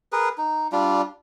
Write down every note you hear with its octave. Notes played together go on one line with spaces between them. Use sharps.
G#4 A#4 B4
D#4
G3 D4 F4